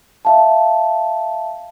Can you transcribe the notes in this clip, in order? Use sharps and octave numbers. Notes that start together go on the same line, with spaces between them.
E5 F5 A5